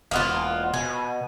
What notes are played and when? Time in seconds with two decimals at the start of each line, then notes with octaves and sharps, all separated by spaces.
0.11 E1 A#3 B3 F4
0.74 B2 G#5